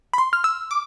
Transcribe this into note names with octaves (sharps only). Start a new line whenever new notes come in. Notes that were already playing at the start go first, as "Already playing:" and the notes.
B5
C6
F6
E6
D6